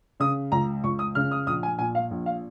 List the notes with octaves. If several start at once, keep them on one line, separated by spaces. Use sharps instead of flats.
C#3 D#6
C#2 A#5
C#2 C#6
D#6
C#3 F6
D#6
A#1 D#6
G#5
A#2 G#5
F5
A#1
F5